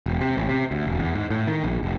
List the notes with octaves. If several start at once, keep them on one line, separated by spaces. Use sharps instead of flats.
E1
C3
A1
C3
D2
E1
E2
G#2
A2
D#3
A#1
F1